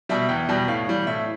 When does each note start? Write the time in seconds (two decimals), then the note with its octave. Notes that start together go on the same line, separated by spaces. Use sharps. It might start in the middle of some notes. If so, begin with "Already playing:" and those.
0.09 B2 G3 E5
0.29 E2 G5
0.49 B2 G3
0.68 A2 F5
0.87 E3 G3
1.07 A2 E5